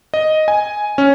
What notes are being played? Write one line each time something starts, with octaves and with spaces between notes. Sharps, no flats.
D#5
G#5
C#4